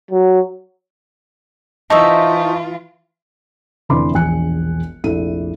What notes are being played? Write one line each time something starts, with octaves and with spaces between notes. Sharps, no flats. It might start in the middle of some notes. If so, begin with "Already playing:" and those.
F#3
E3 D#4 F4 C5 E5 A5 C#6 D#6
F1 D3 E3 B5 C6 D6
E1 A#1 G#5 F#6 C#7
F1 A#1 E4 A4 D#7